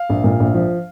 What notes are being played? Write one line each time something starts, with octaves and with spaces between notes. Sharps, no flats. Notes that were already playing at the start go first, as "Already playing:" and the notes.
Already playing: F5
A#1
A#2
A#1
F3